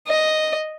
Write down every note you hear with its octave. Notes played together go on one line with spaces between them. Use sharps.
D#5